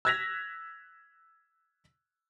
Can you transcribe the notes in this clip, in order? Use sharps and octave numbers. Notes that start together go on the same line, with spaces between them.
E6 F#6 G#6 A#6 B6 F7